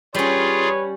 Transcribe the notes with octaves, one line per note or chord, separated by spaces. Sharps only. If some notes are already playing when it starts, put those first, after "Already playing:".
G3 C#4 F4 G#4 B4 C#5